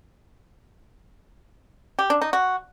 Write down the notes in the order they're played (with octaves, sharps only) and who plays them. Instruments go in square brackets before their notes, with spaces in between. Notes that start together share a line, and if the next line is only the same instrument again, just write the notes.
[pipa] G4
D4
D#4
F#4